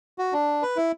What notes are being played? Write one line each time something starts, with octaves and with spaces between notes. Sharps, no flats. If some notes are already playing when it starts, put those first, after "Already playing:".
F#4
D4
B4
E4